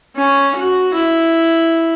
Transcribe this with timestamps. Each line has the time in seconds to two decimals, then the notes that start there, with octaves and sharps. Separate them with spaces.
0.16 C#4
0.56 F#4
0.94 E4